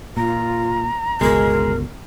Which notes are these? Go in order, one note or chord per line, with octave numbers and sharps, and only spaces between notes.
A#2 F4 A#5
G1 C#2 B2 G#3 G#4 A#4